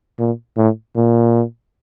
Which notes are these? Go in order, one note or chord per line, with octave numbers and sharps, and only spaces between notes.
A#2
A2
A#2